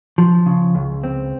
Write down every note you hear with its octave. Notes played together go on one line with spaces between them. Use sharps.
F3
C#3
C#2
C4